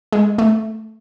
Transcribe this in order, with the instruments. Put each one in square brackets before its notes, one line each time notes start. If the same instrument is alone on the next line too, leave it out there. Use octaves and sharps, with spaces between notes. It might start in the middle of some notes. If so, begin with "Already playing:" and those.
[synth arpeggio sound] G#3
A3